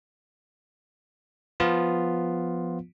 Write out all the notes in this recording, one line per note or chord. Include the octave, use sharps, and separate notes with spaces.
F3 B3 F4